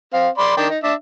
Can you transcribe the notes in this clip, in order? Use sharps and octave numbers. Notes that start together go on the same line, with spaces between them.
C4 F5
D5 B5 C6
D#3 D4 G5
D#4
D4 E5